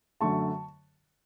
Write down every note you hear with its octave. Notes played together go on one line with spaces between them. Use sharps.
F#2 D3 A3 A5 C#6